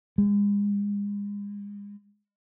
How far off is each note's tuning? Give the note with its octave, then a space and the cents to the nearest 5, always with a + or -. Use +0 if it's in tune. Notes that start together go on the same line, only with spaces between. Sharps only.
G#3 -35